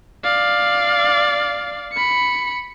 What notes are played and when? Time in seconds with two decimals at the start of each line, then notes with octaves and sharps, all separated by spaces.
0.24 D5 F5
1.93 B5 C#7